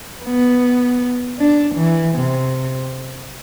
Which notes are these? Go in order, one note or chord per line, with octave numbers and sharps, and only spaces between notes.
B3
D4
E3
C3